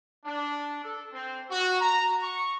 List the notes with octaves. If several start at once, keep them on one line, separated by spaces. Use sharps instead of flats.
D4
A4
C4
F#4
A#5
C#6